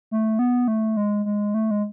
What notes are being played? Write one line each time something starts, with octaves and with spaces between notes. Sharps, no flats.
A3
B3
A3
G#3
G#3
A3
G#3